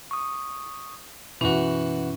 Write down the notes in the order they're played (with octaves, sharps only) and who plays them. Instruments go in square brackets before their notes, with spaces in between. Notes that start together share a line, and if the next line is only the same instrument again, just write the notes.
[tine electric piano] C#6 D#6
[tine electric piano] F#2 B2 [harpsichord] E3 F#4 [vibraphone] C#4